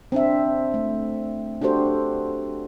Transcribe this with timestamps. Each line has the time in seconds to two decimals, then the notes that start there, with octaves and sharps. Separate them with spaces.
0.12 C4 D4 E5
0.74 A3
1.62 D4 F#4 G4 A4 C5